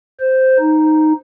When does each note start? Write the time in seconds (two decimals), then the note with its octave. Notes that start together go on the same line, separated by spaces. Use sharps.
0.20 C5
0.59 D#4